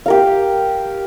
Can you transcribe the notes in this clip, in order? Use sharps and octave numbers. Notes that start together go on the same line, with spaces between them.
G4 A#4 F5